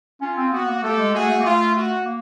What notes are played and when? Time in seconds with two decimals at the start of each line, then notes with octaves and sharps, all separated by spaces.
0.21 C#4 F4
0.37 C4
0.53 B3 F#4
0.68 A#3
0.83 A3 G4 A4
0.99 G#3
1.13 A3 F#4 G#4
1.28 A3
1.40 A#3
1.44 A3 F4
1.76 F#4
2.05 A#3